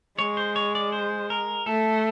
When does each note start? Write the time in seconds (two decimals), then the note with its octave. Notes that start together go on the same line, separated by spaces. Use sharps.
0.19 G#3 C#5
0.37 C5
0.56 C#5
0.75 D5
0.92 C5
1.30 A#4
1.66 A3 A4